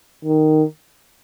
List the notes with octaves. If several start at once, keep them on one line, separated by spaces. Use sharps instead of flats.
D#3